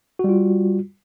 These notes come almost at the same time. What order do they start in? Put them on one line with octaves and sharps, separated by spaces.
F#4 G3 F4